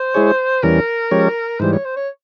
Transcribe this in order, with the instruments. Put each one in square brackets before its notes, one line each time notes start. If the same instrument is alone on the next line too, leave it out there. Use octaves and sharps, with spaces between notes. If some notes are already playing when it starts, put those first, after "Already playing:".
Already playing: [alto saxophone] C5
[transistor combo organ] G#3 E4 G#4 C#5
[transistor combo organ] E2 E3 G3 C#4 [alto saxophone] A#4
[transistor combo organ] F3 G#3 C#4 G4 C#5
[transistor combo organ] G#2 E3 G3 [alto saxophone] C5
[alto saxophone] C#5
C5
C#5